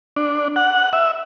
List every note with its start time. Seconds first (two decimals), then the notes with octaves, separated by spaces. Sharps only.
0.16 D4
0.56 F#5
0.93 E5